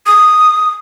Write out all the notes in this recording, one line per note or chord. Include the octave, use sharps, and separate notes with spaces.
D#6